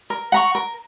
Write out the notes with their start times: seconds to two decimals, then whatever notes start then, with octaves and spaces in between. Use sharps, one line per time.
0.10 A#4
0.32 F#5 A#5 C#6
0.55 A#4